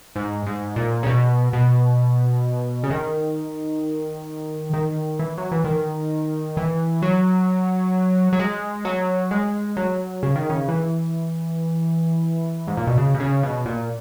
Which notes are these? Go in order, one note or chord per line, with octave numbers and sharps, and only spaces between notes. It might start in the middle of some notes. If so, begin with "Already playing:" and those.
G#2
G#2
A#2
C#3
B2
B2
C#3
D#3
D#3
E3
F#3
E3
D#3
E3
F#3
F#3
G#3
F#3
G#3
F#3
C#3
D#3
C#3
E3
G#2
A#2
B2
C#3
B2
C#3
B2
A#2